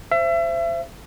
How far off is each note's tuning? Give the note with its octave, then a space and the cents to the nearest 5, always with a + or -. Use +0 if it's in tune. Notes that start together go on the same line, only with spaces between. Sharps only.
C5 +5 E5 +35